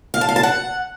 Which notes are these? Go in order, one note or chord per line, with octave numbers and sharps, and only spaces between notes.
F5
A5
F5
A5
F#5